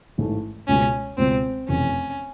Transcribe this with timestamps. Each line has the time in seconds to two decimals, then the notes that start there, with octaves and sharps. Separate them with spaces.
0.18 A1 G#2 E3 A3
0.68 C#2 B2 G#3 C#4
1.18 C#2 B2 G#3 C4
1.68 F1 E2 B2 C#4